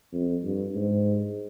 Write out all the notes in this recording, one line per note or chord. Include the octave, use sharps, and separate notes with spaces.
F2
G2
G#2